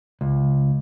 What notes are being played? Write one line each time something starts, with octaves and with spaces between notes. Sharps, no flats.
C#2